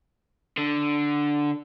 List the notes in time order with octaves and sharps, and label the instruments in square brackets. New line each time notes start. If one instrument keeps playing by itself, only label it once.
[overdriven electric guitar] D3